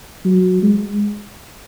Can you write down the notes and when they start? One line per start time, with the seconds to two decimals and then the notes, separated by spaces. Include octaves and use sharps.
0.25 F#3
0.63 G#3